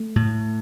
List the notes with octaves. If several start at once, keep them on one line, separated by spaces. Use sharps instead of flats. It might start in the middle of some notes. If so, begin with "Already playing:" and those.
Already playing: A3
A2